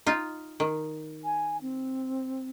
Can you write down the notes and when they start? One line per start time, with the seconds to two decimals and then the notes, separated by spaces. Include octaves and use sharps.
0.06 D#4 F4
0.60 D#3
1.24 G#5
1.62 C4